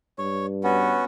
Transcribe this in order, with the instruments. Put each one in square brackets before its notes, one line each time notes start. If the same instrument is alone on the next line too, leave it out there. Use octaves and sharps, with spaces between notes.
[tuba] G2 [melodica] C#5
[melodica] B3 C#4 F#4